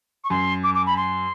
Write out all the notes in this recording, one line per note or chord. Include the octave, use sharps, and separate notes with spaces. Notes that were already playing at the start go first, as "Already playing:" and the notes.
C#6
F#2 C6
D6
D6
B5
C6